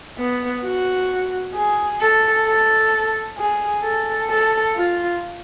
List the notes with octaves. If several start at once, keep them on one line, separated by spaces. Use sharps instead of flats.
B3
F#4
G#4
A4
A4
G#4
A4
A4
F4